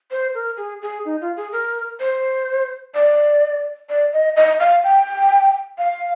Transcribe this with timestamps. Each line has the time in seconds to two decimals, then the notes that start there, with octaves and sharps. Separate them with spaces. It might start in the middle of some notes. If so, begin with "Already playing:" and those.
0.11 C5
0.34 A#4
0.57 G#4
0.82 G#4
1.05 D#4
1.21 F4
1.37 G#4
1.52 A#4
2.00 C5
2.94 D5
3.89 D5
4.13 D#5
4.36 D#5
4.60 F5
4.84 G5
5.78 F5